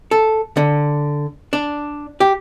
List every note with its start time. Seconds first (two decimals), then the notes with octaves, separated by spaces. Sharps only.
0.11 A4
0.57 D3
1.53 D4
2.20 G4